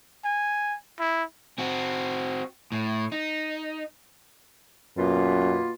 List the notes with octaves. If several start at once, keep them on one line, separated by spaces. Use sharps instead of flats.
G#5
E4
C4 F#4
A2
D#4
F#2 B2 A#3 F4